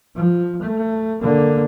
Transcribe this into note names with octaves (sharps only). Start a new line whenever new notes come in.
F3
A3
D3 A#3